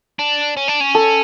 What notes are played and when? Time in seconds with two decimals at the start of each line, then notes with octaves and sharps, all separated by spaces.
0.19 D4
0.57 C#4
0.68 D4
0.81 C#4
0.95 A4